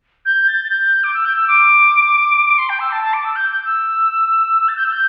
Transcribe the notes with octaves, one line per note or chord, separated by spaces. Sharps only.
G6
A6
A6
G6
D6
E6
G6
E6
D6
D6
C6
G5
E6
A5
A5
D6
E6
G6
G6
G6
E6
A6
G6
E6
G6